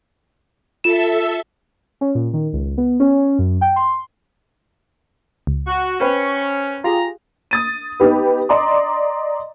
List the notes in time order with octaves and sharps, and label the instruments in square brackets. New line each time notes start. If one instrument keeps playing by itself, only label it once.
[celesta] F4 E7 [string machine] A4 E5
[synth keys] C#4
A#2
D#3
C#2
B3
C#4
F#2
G5
C6
[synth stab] C#2
[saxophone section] F#4 [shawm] C#6
[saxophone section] C#4 [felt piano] B4 C5 G5
[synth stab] F4 G4 G#4 [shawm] A#5
[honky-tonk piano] D#6 A6 D#7
B3 D#4 G4 B4
D5 D#5 A#5 C6 D6